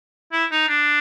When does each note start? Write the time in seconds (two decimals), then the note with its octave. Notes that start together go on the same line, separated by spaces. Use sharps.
0.32 E4
0.51 D#4
0.68 D4